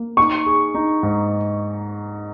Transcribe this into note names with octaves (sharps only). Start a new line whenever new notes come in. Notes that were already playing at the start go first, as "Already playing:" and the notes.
Already playing: A#3
D#4 C#6
G#4
D#4
G#2